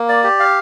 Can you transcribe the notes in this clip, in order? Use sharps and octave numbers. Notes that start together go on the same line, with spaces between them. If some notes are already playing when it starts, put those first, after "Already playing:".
Already playing: A#3
D5
G4
F5